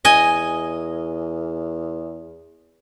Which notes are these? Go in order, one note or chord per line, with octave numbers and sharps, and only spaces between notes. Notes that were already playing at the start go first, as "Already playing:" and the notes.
E2 D#5 G#5